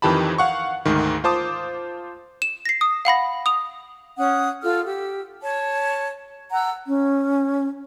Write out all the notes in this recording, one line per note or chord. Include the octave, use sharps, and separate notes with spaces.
F2 D#3 E3 G4 A5 B5
F5 F#5 C#6
D2 G#2 D#3
F4 C5 A5 D6 D#6
E7
A#6 C7
D#6
F5 F#5 B5 A#6
D#6 F7
C#4 F#5 D#6
F4 A4 E6 F6
G4 E6
C#5 A5
F#5 A#5 E6
C#4